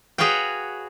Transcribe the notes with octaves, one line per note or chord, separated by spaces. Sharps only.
F#4 G#4 B4 C#5 F5 G5